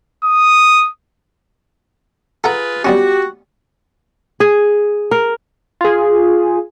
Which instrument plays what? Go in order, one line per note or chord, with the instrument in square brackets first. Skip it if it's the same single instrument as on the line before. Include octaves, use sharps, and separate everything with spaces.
[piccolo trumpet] D#6
[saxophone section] F4 G#4 B4 [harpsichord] A4 F#5 A#5
[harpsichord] G3 B3 C#4 [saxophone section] F#4 [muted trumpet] G4
[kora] G#4
A#4
[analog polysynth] F4 G#4